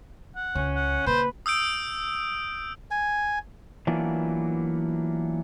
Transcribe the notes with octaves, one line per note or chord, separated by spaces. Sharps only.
F#5
C#2 C#4
F#5
C#3 A#3 B4 C5
D#6 E6 G6 D7
G#5
E3 F#3 A#3 B3 D4 F4